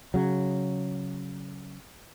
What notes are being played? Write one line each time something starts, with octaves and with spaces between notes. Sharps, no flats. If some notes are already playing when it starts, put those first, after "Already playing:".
C#3 F#3